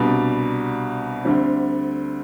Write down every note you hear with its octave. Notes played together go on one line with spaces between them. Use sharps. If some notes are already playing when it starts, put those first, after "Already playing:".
Already playing: C2 B2 G3 D4
D2 D3 G3 C4